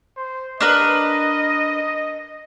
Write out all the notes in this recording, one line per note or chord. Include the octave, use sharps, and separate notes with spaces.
C5
D4 A#4 B4 D#5